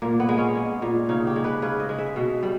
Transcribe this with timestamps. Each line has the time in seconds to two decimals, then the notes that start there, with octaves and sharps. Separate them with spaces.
0.02 A#2 A#3
0.20 B3
0.29 G#3
0.38 C#4
0.55 G#3
0.82 A#2
1.09 C#3 D#4
1.27 G4
1.36 G#3
1.44 B4
1.62 C#3 B4
1.80 D#5
1.89 G#3
1.98 E5
2.16 B2
2.43 G3